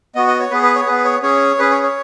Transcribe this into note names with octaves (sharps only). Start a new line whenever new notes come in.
B3 F#4 D#5
D#5
C#5
B3 G#4 B4
B4
C#5
B3 G#4 B4
C#5
C#4 G#4 C#5
C#4 G#4 B4
C#5
C#5